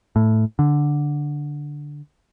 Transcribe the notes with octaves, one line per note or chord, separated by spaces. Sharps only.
A2
D3